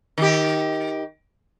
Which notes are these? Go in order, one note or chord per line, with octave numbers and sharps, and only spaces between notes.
D#3 G4